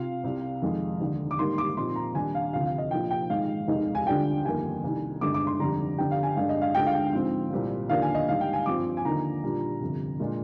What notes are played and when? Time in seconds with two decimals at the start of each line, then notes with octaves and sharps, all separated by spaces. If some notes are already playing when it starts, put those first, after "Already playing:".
Already playing: C3 F4 F5
0.24 C2 C3 G3
0.62 F2 D#3 G#3
1.00 F1 D#2 D3
1.31 D6
1.39 G#2 D#3 G3 A#3 C6
1.58 D6
1.77 A#2 F3 C4 D#4 C6
1.96 A#5
2.14 D#2 D#3 G3 D4 G#5
2.35 F5
2.53 D2 C3 F3 F5
2.66 F5
2.78 D#5
2.91 A#1 A#2 F3 G5
3.11 G5
3.30 G#1 G#2 F3 G#3 F5
3.68 F1 D#2 D#3 G#3 D#4
3.95 G#5
4.06 D2 D3 G3 D4 F4 G5
4.44 G1 F2 D#3 A#3 G#5
4.84 C2 C3 D#3
5.21 G1 G2 D3 G#3 D6
5.34 D6
5.47 C6
5.59 F1 F2 D3 G3 A#5
5.98 G1 G2 D3 G3 G5
6.11 F5
6.23 G#5
6.36 G2 D3 G#3 D4 F5
6.49 D#5
6.62 F5
6.74 D2 D3 G#3 D4 F4 G5
6.86 F5
6.94 G5
7.13 G#2 F3 C4
7.51 C2 A#2 G3 C4
7.89 D#2 D3 F3 A#3 D4 F5
8.02 G#5
8.15 D#5
8.28 G#2 D#3 G3 F5
8.41 G5
8.53 G#5
8.66 G2 F3 C4 F4 D6
8.97 G#5
9.05 D#2 D3 F3 A#3 D#4 A#5
9.43 A#2 G3 D4 F4
9.81 G1 F2 C3
10.20 A#2 G#3 D4 F4